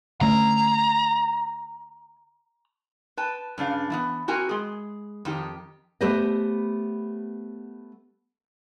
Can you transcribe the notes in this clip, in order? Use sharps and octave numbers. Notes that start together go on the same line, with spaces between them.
D3 A3 C#4 A#5
B4 G5 A5
G2 C#3 D4 F5
E3 A#3 B3
C4 F#4 A#4 G#5
G#3 G#4
F2 D#3 G4
A3 B3 G4 B4 C5 D#5